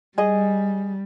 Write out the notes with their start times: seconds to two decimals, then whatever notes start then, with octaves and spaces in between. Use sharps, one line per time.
0.18 G3 G#4 D#5